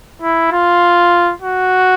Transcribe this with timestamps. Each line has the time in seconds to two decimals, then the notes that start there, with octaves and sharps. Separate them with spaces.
0.22 E4
0.52 F4
1.42 F#4